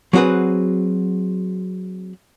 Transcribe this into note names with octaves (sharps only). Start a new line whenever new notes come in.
F#3 C4 F#4 G#4 B4